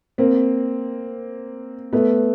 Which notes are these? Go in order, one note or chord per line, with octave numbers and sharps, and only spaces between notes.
A#3 C4
A3 B3